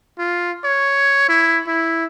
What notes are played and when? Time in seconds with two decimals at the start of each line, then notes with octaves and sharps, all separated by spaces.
0.19 F4
0.64 C#5
1.29 E4
1.67 E4